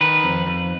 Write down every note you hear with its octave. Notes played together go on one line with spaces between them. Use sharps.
D#3 B4
F2
F2